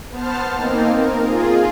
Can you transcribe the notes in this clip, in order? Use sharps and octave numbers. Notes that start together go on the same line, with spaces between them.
B3 C5 A5 F6
A#3 C4 D#4
A#4
F4 G#4